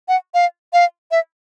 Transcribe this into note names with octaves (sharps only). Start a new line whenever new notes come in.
F#5
F5
F5
E5